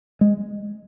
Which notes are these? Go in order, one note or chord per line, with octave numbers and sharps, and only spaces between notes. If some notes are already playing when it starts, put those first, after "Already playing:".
G#3